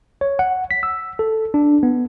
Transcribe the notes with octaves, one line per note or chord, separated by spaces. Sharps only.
C#5
F#5
B6
E6
A4
D4
B3